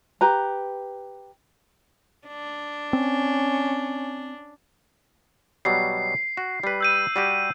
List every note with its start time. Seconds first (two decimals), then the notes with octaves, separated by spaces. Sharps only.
0.21 G4 B4 A#5
2.27 D4
2.93 C4 C#4
5.65 B2 F#3 G3 C7
6.37 F#4
6.63 G3 B4
6.81 E6 G6 D#7
7.16 G3 F#4 G4